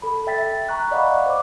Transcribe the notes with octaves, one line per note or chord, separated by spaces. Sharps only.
A4 B5
E5 G5 A6 B6
A#5 C#6 F#6
D5 D#5 F5 F#5 B5 C#6
C5 D6